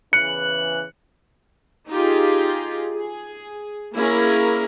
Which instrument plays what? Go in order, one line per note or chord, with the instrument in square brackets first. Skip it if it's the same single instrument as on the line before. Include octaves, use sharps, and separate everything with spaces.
[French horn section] E2 C#3 E3 [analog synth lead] F#6 [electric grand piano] C#7
[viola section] D#4 F4 G4 G#4
G#4
A#3 C#4 E4 G#4 A#4